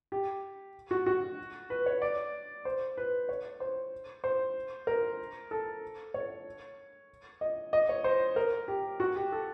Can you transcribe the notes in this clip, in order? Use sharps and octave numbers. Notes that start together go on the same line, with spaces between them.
G4
F#4
F#4
B4
C#5
D5
C5
B4
C#5
C5
C5
A#4
A4
C#5
D#5
D#5
C#5
C5
A#4
G4
F#4
G4
A4